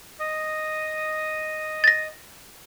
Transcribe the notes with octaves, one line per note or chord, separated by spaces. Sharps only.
D#5 D#6
A6 A#6